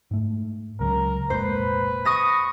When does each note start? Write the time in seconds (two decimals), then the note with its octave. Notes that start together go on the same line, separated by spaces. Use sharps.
0.11 G#2 A3
0.80 C#2 C#3 F#3 A#4
1.30 F1 A#2 G#3 B4 C5
2.05 C#6 D#6 A#6